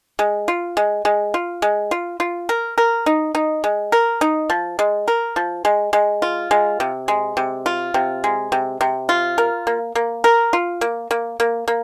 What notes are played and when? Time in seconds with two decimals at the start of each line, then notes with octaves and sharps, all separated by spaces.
0.19 G#3
0.48 F4
0.77 G#3
1.05 G#3
1.34 F4
1.62 G#3
1.91 F4
2.20 F4
2.49 A#4
2.78 A#4
3.06 D#4
3.35 D#4
3.64 G#3
3.92 A#4
4.21 D#4
4.50 F3
4.79 G#3
5.08 A#4
5.36 F3
5.65 G#3
5.93 G#3
6.22 F4
6.51 G#3
6.80 C3
7.08 G#3
7.37 C3
7.66 F4
7.94 C3
8.24 G#3
8.52 C3
8.81 C3
9.09 F4
9.38 A#4
9.67 A#3
9.95 A#3
10.24 A#4
10.53 F4
10.81 A#3
11.11 A#3
11.40 A#3
11.68 A#3